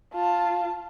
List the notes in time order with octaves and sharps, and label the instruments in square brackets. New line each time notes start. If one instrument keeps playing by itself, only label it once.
[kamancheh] F4 A5